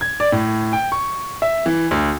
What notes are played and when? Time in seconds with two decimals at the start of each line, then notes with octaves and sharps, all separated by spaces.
0.01 G#6
0.20 D5
0.32 A2
0.73 G5
0.92 C#6
1.42 E5
1.66 E3
1.91 D2